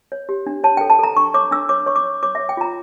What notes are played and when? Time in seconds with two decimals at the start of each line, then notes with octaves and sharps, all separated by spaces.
0.12 C#5
0.29 G4
0.46 D4
0.64 C#5 A5
0.77 A4 G5
0.90 A5
0.99 A4 A#5
1.17 D4 C#6
1.34 C#5 D6
1.51 D4 E6
1.69 C#5 D6
1.86 C#5 C#6
1.96 D6
2.04 C#5
2.23 C#5 D6
2.35 C#5 E5
2.49 G5
2.57 F4 A#5